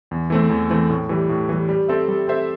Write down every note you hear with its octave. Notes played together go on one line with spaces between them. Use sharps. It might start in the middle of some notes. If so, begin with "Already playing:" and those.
E2
E3 A3 C4
E2
E3 A3 C4
A2
E3 G3
A2
E3 G3
G3
C4 A4 C5 E5
G3
C4 A4 C5 E5